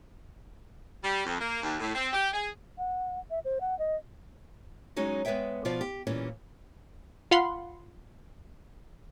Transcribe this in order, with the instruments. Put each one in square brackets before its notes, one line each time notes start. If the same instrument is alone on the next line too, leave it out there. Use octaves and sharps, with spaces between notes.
[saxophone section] G3
F2
A#3
D#2
A2
C4
G4
G#4
[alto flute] F#5
E5
C5
F#5
D#5
[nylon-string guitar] F#3 G#3 C#4 D#4 F#4
G#3 B3 B4 C#5 E5 G5
B2 F3 F4 D5 F5
G4
A#2 E3 G3 C#4
[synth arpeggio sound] F4 F5 F#5 B5 C6